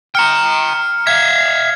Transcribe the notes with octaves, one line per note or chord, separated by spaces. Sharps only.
G5 A#5 F6 C#7
E5 F5 G#6